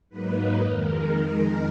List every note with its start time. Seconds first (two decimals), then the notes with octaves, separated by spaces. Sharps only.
0.09 G#2 F#3 A#3 D#4 B4
0.60 F2 D#3 G#3 A#4